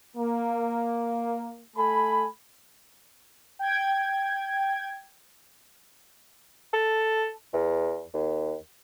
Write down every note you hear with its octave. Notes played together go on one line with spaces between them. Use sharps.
A#3
A3 A4 G#5 B5
G5 G#6
A4
E2
D#2